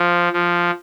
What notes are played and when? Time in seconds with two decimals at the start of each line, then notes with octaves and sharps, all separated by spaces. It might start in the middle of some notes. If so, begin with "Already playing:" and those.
Already playing: F3
0.33 F3